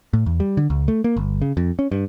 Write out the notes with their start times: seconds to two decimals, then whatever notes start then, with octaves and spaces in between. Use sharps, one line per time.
0.13 A2
0.26 E2
0.40 G3
0.57 D3
0.70 C#2
0.88 A3
1.04 A#3
1.17 G1
1.42 C#3
1.57 F2
1.79 C#4
1.92 G2